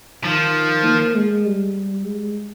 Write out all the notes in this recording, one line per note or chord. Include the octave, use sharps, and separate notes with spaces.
D#3 F3
A#3
G#3
G3
G#3